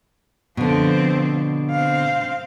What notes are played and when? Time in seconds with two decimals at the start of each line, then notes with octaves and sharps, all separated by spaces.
0.57 B2 D3 F3 C4
1.71 C4 F5